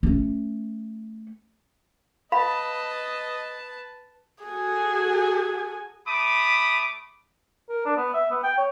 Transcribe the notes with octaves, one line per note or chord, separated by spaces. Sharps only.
A3 C#4
B4 D#5 F5 A5 B5
F#4 G#4 A4 G#5
A3 B5 D6 D#6
A#4
D4
B3
E5
B3
G5
C#5